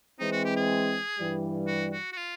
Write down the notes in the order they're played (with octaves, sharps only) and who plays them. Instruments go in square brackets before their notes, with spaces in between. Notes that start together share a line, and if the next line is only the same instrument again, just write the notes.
[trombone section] E3 G#3 C4 [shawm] D#4
[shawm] F#4
G4
G#4
[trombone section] G2 E3 G3
[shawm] F#4
F#4
F#4
F4